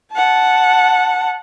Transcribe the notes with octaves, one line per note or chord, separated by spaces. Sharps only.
F#5 A5